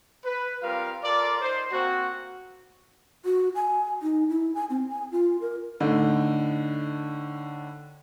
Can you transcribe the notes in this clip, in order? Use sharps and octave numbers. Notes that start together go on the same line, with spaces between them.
B4
G3 C4 F4 A#4 F5
F4 A4 A#4 D5
D#4 C5
A#3 C4 F#4
F#4
G#5
D#4
E4
G#5
C4
G#5
F4
A#4
A2 D3 D#4